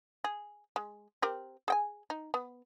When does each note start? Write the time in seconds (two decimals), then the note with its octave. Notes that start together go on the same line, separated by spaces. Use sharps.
0.24 G#4
0.76 G#3
1.22 C4 G4 A#4
1.68 G#4 G5 G#5
2.10 D#4
2.34 B3